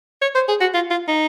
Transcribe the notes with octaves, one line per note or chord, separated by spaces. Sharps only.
C#5
C5
G#4
F#4
F4
F4
D#4